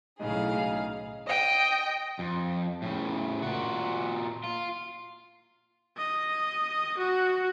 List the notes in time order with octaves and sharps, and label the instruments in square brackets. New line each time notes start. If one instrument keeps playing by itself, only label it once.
[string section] B1 A2 C#3 [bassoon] D#4 [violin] G#4 F5
[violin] D#5 G5
[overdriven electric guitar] F2
A2 C#3
A#2 F#4
F4
[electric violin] D#5
F#4